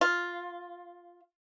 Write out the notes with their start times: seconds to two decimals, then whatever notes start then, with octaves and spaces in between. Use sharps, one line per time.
0.01 F4